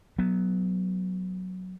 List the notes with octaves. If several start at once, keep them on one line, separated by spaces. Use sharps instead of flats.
F#3 B3